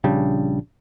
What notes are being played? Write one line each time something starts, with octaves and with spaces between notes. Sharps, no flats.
A#1 C#3 G3 D4